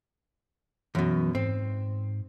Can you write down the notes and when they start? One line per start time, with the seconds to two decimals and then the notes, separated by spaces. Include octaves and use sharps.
0.95 F#2 B2 E3
1.35 G#2 C4